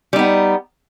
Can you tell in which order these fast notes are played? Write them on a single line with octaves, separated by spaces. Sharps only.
G3 D#4 B3